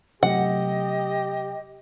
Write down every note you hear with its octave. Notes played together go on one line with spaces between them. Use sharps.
C3 F#3 A3 G4 D#5 F#5